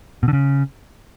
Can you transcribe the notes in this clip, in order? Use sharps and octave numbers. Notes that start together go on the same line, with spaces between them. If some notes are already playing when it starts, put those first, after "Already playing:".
B2
D3
C#3